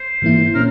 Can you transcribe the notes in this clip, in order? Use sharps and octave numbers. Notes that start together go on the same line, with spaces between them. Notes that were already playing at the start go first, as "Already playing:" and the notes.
Already playing: C5
G#2 E3 A#3 E4
A#2 C#4 A#4